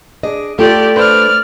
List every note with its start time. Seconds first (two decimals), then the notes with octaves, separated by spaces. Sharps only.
0.23 D4 G#4 D#5
0.59 A3 F4 G4 A4 D5
0.96 D4 B4 C5 D5 F6